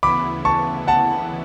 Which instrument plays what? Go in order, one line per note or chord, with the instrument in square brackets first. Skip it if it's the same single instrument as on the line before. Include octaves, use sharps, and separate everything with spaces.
[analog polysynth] D2 C#3 E3 B3 E4 [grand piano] B5 D6
[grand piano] A5 C#6
F#5 A5